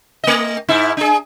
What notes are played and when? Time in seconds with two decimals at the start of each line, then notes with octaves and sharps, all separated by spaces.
0.24 A3 D#5
0.69 G#2 D#4 E4
0.97 D4 G#4